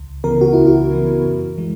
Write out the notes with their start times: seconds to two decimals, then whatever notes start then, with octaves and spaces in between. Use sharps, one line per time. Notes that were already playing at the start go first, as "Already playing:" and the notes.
Already playing: C#2
0.24 C#3 E3 B3 A#4
0.41 F#4
0.53 C#2 E4
0.67 F#4
0.91 C#3 E3 B3
1.24 F#2
1.58 E3 G#3